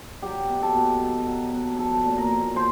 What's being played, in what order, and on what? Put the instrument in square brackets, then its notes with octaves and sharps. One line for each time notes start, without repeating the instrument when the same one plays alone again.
[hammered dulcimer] F#3 G4
B2
A4
B2
F#3
F#3
B2
F3 A4
A#2
A#4
A#2
F3 C5